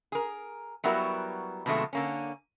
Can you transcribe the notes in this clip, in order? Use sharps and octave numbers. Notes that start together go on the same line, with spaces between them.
G#4 A#4
F#3 G3 B3 E4 F#4 A#4
B2 D3 F3 G#3 A3 C4
D3 A#3 C#4